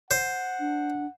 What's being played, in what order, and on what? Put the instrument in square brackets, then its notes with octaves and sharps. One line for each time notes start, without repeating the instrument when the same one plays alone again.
[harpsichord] C5 [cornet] F#5
[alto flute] D4